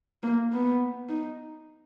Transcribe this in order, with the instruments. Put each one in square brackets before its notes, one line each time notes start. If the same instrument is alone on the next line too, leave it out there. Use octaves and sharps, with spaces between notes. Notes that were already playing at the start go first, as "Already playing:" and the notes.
[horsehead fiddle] A#3
B3
D#4